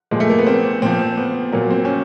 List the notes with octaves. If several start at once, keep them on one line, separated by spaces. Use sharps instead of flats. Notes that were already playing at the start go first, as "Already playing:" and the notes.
A#2 F3 G#3
A3
A#3
B3
C4
A#2 F3 C4
B3
A#2 F#3 A#3
C4
C#4